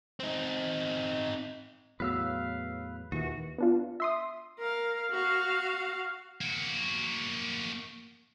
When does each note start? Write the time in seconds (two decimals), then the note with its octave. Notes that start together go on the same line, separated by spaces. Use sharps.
0.20 C4 D#4
2.00 E2 A2 F#3 B4 F5 E6
3.12 D#2 A#2 E3 F#4
3.58 B3 D4 F4
4.00 E5 C6 D#6
4.59 A#4 F5
5.11 F#4 F5
6.41 A#3 F#4